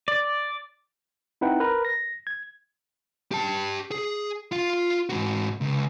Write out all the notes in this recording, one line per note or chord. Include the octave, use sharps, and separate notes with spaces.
D5
C4 D#4 E4 B4 F#5 G5
A#4 B4 A#5
A#6
G#6
G4 A5
G#4
F4 F5
G#2 F#4
C#2